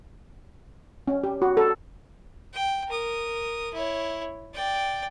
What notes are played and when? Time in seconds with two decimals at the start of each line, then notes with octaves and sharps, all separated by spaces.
1.08 C#4
1.24 G4
1.42 F#4
1.57 A4
2.53 G5
2.89 A#4 D#6
3.74 E4 C#5
4.54 D5 G5